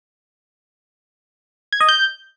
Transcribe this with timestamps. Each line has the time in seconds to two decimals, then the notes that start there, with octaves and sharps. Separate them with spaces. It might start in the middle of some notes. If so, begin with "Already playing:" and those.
1.73 G#6
1.81 D#5
1.89 G6